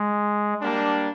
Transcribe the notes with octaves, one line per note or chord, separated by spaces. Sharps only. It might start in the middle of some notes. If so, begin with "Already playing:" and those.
Already playing: G#3
G3 A#3 D4